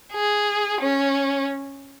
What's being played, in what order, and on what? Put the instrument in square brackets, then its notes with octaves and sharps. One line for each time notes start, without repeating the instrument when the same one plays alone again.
[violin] G#4
C#4